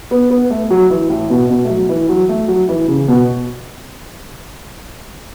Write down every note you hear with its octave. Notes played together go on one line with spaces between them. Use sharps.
B3
B3
A3
F#3
E3
A2
B2
B2
A3
F#3
E3
F#3
A3
F#3
E3
C#3
B2